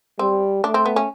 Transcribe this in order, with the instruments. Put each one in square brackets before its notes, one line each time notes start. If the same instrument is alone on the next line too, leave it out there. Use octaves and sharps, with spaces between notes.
[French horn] G3 [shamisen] C4
[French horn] A3 [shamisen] D4
[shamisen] C4
B3
C#4